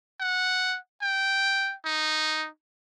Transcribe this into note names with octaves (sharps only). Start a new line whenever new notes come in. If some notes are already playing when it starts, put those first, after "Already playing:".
F#5
G5
D#4